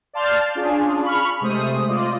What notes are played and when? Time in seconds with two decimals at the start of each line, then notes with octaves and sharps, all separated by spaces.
0.13 D5 F5 A5 C6 F6 G6
0.55 C#4 D4 F4 G#4
1.03 B5 C#6 F6
1.41 C3 G#3 A3 C5 D#6
1.87 F4 C5 D5 D#5